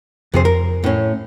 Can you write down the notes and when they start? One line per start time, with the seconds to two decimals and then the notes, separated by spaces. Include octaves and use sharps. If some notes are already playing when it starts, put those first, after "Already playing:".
0.34 F2 C3 G#4 C5
0.45 A#4
0.84 A2 C#4